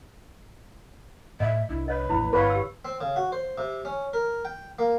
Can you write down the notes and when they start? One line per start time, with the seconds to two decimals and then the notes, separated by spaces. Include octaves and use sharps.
1.40 A2 D#5 E5
1.69 C2 D4 E4
1.88 B4 C#5 D#5
2.09 D#1 A1 F2 E4 B5
2.33 G1 B4 C#5 F5
2.50 G4 E6
2.85 C4
3.01 C#3
3.16 F#4
3.32 C5
3.58 C3
3.85 C#4
4.13 A#4
4.45 G5
4.79 A#3